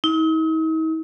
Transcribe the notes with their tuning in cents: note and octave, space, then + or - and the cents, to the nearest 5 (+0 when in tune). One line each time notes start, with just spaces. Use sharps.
D#4 +45